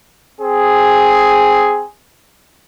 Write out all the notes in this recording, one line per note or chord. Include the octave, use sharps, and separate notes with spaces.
C4 G#4